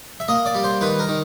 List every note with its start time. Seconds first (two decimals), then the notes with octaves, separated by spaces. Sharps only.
0.20 E5
0.28 A#3 D#5
0.46 D5
0.55 G3
0.64 C5
0.81 D#3 B4
0.99 A#4
1.08 D#3